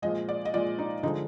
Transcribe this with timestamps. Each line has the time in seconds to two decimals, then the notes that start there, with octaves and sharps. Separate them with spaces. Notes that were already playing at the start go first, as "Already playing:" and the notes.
0.02 A#2 F3 G#3 D#5
0.29 D5
0.45 D#5
0.54 A#2 F3 G#3 D5
0.78 D#4
1.03 D3 F3 G#3 D#4